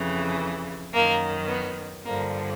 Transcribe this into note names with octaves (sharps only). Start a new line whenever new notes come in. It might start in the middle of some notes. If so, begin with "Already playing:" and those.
Already playing: F2 C#3 E3
F#2 D#3 A#3
B3
G2 D3 F3 A#3